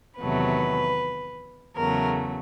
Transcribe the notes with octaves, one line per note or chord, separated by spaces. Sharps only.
E2 C3 D#3 F#3 A3 B4
E2 C#3 F#3 A3 A#4